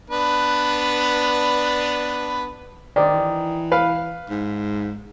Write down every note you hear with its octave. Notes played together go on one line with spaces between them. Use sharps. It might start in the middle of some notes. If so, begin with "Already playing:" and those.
B3 D4 B4
D#3 C5 D5
E3
B4 F5
G#2